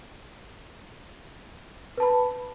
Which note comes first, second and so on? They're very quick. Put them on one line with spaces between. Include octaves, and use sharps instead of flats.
B4 A5 B5